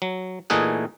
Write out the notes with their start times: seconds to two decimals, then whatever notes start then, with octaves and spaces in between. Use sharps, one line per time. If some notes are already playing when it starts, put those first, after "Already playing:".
0.02 F#3
0.50 A#2 E3 A3 D#4 G#4 F#5